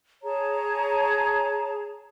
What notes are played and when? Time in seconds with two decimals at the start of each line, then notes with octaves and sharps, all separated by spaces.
0.23 G#4 C#5 A5 A#5